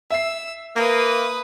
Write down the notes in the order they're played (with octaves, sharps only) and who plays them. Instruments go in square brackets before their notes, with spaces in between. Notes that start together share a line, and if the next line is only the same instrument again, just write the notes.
[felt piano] E5 C7 [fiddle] E6
[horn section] A#3 [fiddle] B4 D#6